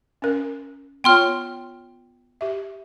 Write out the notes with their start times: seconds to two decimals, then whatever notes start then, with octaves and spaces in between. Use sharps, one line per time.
0.22 C#4 A#4
1.04 B3 F4 C#5 G5 C6 F6
2.41 G4 E5